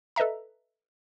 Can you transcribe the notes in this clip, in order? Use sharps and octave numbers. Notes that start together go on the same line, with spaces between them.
A4 B4 D#5 E5 A#5